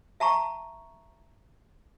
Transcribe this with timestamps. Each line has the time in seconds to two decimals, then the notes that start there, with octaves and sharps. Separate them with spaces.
0.20 E5 A5 A#5 C#6